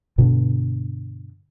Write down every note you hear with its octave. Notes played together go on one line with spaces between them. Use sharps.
G2 B2 D3